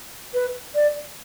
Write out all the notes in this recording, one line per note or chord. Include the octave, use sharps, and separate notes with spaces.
B4
D5